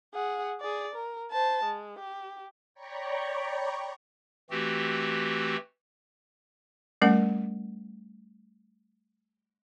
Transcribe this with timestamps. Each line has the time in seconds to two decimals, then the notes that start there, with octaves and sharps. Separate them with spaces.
0.14 G#4 F#5
0.60 G#4 D5
0.96 A#4
1.32 C5 A5
1.64 G#3
1.99 G4
2.74 C#5 D5 G5 A#5 B5 C#6
4.51 E3 A3 C4 F#4 G4
7.02 G3 A3 C#4 A#4 F#5